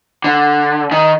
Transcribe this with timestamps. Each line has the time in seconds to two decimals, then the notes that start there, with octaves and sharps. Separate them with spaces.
0.24 D3
0.91 D#3